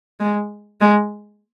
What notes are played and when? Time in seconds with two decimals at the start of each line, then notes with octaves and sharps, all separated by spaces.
0.20 G#3
0.81 G#3